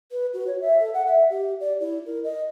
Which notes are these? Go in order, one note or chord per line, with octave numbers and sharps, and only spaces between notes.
B4
F#4
C#5
E5
A4
F#5
E5
G4
D5
E4
A#4
D#5